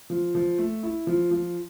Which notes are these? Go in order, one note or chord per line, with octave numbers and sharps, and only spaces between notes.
F3
F3
A3
E4
F3
F3